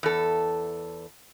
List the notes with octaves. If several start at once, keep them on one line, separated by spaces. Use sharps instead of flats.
E2 A4